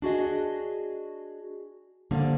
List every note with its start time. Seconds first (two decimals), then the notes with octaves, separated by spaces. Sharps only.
0.02 D4 F#4 G#4 D#5
2.11 D3 F3 G3 A#3